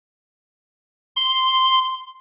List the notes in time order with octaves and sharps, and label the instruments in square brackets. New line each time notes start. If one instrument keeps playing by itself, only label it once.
[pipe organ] C6